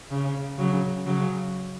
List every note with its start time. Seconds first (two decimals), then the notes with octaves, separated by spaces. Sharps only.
0.11 C#3
0.58 C#3 F#3
1.06 C#3 F#3